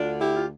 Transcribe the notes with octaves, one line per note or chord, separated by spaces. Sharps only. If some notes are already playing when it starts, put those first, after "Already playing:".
Already playing: D2 D3 D4 F4
E4 G4
F4